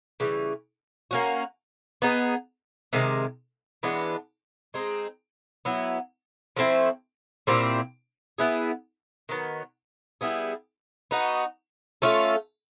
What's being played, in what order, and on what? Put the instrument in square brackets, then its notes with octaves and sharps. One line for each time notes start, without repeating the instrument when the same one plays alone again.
[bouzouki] C#3 E3 G3
A#3 C#4 F#4
B3 D#4 G#4
C3 D#3 G#3
E3 G#3 B3 D4
G#3 C4 D#4 G#4
F#3 B3 E4
F3 A3 C4 E4
A#2 G3 C4 E4
B3 E4 G#4 B4
D#3 F#3 B3
G3 B3 E4 G#4
B3 D#4 F#4
A3 C#4 F4 A4